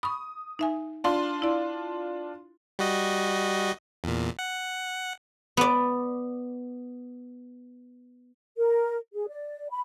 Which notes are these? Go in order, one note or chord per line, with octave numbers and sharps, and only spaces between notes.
B5 C#6 D#6
D#4 E5 G#5
D4 F4 C6
E4 D5
G3 F#4 D#5
E2 A#2
F#5
B3 D5
A#4
G#4
D5
B5